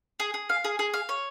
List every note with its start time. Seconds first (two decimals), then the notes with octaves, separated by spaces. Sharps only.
0.20 G#4
0.34 G#4
0.49 F5
0.64 G#4
0.79 G#4
0.94 F5
1.09 C#5